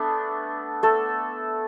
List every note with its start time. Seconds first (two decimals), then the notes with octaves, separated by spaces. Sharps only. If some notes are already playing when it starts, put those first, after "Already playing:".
Already playing: A3 B3 D4
0.83 A3 A4